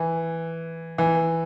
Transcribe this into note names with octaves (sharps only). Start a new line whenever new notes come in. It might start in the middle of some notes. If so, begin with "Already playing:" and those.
Already playing: E3
E3